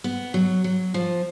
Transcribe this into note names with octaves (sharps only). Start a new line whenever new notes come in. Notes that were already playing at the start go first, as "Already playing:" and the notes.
B3
F#3
F#3
F3